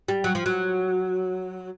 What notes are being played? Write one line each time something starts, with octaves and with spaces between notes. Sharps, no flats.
G3
F#3
F3
F#3